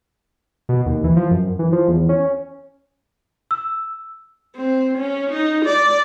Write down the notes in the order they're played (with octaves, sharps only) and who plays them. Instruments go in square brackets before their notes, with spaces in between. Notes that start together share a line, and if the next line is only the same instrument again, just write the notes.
[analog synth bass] B2
D#2
E3
F3
F#2
E3
F3
E2
C#4
[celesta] E6
[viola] C4
C#4
D#4
D5